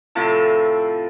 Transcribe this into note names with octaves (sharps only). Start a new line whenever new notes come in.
A2 C3 F3 A5